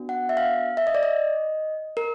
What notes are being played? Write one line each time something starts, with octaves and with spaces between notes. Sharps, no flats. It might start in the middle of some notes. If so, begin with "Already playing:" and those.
Already playing: B3 D4 F#4
F#5
E5
F5
E5
D#5
D5
D#5
A#4